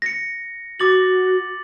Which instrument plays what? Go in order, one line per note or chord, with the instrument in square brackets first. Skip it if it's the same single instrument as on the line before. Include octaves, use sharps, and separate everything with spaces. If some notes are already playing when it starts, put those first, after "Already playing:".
[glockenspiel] A#6 C#7
[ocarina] F#4 [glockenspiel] D6 A6 F#7